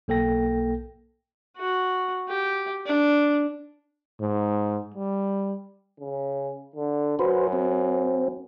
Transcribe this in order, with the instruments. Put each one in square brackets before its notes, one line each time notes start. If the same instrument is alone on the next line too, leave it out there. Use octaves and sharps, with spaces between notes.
[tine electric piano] B1 A#3 A4 G5 A#6
[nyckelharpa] F#4
G4
D4
[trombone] G#2
G3
[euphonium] C#3
D3
[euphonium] F#2 [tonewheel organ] F#4 B4 C5
[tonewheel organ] C4